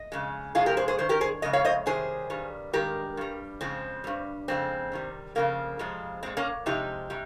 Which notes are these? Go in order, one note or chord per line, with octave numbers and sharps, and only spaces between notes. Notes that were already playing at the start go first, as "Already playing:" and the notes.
Already playing: D#5
F2 C#3 G#3
C3 F3 G#3 F4 G#4
G4 A#4
G#4 C5
G#4 C5
G2 D#3 C5
G4 A#4
G#4 C5
F2 C#3 G#3 D#5
C#5 F5
C5 D#5
C3 D#3 G3 G#4 C5
G2 D#3 G3
G2 D#3 G#3 G4 A#4
G2 G3
F2 C#3 F3 G#3 C4
G2 G3
F2 C#3 G#3 C4
C3 D#3 G3
F2 C#3 F3 A#3
F2 C3 F3 G#3
A#2 G#3 C4
A#3 C#4
C3 F3 G#3 D#4 G4
C3 G3